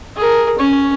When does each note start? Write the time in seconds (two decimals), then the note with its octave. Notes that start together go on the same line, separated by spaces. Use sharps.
0.17 G#4 A#4
0.59 C#4 C#5